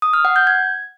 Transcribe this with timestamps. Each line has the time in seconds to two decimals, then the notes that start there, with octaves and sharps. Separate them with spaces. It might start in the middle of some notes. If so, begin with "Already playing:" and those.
0.02 D#6
0.13 F6
0.25 F#5
0.36 G6
0.47 G#6